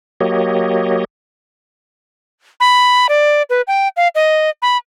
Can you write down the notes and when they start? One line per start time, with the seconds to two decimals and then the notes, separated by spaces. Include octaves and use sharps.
0.21 F#3 A#3 G4 C#5 D#5
2.60 B5
3.09 D5
3.50 B4
3.67 G5
3.97 F5
4.15 D#5
4.62 B5